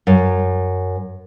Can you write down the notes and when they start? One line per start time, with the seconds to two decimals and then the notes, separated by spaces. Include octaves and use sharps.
0.07 F#2